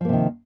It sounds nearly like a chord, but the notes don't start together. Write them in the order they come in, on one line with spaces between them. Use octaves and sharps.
F3 A#3 C3 D#3